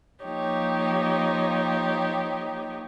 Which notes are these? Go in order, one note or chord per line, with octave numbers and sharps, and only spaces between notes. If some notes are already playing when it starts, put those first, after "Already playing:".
F3 A#3 D#4 G4 C#5